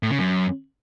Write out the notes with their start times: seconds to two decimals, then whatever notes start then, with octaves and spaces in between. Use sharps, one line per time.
0.03 A2
0.11 C#3
0.19 F#2